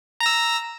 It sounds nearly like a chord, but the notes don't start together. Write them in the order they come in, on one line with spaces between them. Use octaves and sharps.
A#5 A#6 E6